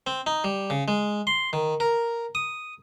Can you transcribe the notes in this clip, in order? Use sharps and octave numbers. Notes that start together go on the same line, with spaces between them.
C4
D#4
G3
C#3
G#3
C6
D#3
A#4
D#6